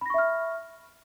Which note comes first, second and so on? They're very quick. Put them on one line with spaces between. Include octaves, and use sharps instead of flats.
B5 A#6 C#6 E5 F6